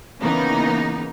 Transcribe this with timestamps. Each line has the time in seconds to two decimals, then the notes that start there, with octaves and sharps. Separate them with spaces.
0.20 C#3 E3 A#3 B3 D#4